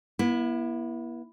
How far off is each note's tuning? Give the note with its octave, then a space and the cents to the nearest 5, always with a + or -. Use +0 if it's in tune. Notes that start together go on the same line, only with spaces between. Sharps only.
B3 -45 E4 +5